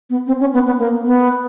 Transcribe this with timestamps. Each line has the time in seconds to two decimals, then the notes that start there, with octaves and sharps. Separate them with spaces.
0.10 B3
0.27 C4
0.40 C#4
0.54 B3
0.66 B3
0.79 A#3
1.05 B3